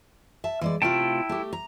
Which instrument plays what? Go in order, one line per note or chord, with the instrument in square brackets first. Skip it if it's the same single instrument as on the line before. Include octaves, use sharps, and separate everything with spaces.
[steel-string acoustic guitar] E5 A5
E3 G#3 D5
[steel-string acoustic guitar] C3 A3 F4 [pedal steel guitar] E4 G5 A5
[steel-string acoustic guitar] A3 G4
A#5